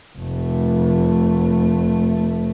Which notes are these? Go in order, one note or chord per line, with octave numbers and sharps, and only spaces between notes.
F1 A3